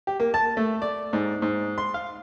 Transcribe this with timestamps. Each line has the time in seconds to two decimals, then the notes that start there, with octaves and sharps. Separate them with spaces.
0.07 G4
0.20 A#3
0.34 A5
0.57 A3
0.82 D5
1.13 G#2
1.42 G#2
1.78 C6
1.94 F5